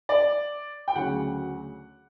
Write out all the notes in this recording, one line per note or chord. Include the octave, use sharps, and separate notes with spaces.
D5
G5
D2 C#3 F#3 C#4 F#5